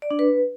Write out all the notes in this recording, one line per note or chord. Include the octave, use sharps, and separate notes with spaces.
D5
D4
B4